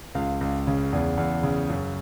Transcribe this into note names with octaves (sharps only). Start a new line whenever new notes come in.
C#2 F5
C#2
C#3
E2
E2
C#3
F#2